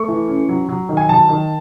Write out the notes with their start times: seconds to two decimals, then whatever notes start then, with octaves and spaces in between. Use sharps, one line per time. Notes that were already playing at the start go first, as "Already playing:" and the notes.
Already playing: A3 C#6
0.08 E3
0.28 C#4
0.49 F#3
0.69 F#3
0.89 D#3
0.97 G#5
1.09 F#3 A5
1.29 D#3